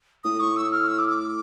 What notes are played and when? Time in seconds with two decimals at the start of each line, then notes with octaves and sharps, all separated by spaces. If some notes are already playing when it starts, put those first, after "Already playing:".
0.24 A2 D#6
0.40 C#6
0.56 E6
0.72 F6
0.88 E6
0.99 D6
1.10 D6